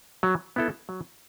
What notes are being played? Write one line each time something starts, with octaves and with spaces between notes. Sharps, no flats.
F#3
B3 E4 A4
F#3